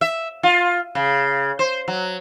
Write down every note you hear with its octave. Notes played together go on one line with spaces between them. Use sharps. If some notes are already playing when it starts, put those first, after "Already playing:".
E5
F4
C#3
C5
F#3